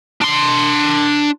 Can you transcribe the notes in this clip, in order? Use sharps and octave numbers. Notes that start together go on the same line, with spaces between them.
D4 C6